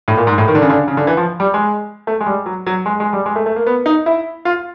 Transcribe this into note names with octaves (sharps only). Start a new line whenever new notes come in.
A2
A#2
G#2
A2
D#3
D3
C#3
D3
C#3
D3
E3
F3
G3
G#3
A3
G#3
G3
F#3
F#3
G#3
G#3
G3
G#3
A3
A3
A#3
B3
D#4
E4
F4